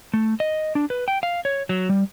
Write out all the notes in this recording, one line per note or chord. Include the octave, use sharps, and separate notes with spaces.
A3
D#5
D4
B4
G5
F5
C#5
F#3
G3